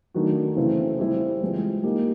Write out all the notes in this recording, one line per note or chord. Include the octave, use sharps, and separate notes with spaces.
D#3 F#3 A3 D4 F#4
C#3 E3 A3 C4 E4
G3 C4 E4 G4
E3 G#3 C4 F4
A#3 D#4 G4